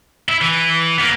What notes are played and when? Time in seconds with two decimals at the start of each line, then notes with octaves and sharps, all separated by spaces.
0.29 E4
0.41 E3
0.98 A#3 B3